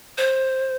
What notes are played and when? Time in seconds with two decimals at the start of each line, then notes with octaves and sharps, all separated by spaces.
0.18 C5